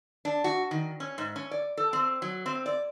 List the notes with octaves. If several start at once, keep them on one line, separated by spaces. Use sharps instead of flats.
D4
F#4
D#3
C#4
G#2
C#4
D5
A4
C4
F#3
C4
D5